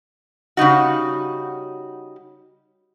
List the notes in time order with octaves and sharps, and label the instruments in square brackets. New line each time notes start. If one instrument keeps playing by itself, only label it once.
[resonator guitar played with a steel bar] C#3 G3 D#4 F#4